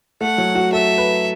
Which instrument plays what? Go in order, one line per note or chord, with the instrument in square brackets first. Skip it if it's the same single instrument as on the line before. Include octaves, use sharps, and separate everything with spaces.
[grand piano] A3 [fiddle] F#5
[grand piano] F#3
F#4
[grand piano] A4 [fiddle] E5
[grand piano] B4